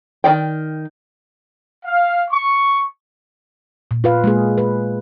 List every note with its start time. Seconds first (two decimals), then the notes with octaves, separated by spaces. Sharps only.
0.24 D#3 F3 D5 G5
1.85 F5
2.31 C#6
3.91 A#2
4.04 F4 B4 F5
4.24 G#3 A#3 G#4
4.58 B4